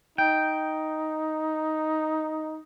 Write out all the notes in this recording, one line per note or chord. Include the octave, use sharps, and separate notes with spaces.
D#4 G5